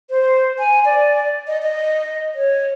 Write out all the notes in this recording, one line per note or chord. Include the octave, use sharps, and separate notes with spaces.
C5
G#5
D5
D#5
D#5
C#5